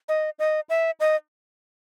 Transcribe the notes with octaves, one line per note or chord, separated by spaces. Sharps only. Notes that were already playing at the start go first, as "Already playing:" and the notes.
D#5
D#5
E5
D#5